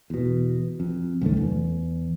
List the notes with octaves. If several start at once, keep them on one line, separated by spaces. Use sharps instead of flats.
E2 B2
F2
C2 F#2 D#3 A3
E2